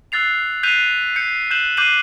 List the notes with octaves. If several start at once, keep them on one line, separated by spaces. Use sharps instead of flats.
E6 F#6 A6 C7 F7
F#6 G6 B6 C7 D#7 F7
G6 C#7
F#6 G6 E7 F#7
D6 F#6 G6 C7 D#7 F#7